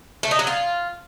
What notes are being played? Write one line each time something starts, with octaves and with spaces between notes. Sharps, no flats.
A3
D#4
F#3
F4